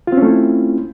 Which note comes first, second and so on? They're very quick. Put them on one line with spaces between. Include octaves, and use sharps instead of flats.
F4 C4 C#4 A3 E4